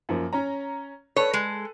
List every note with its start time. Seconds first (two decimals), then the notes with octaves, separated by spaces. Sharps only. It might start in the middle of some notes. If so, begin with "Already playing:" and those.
0.09 F#2 F3 A#3
0.33 C#4 C#5 A#5
1.16 A4 B4 C#5
1.33 G#3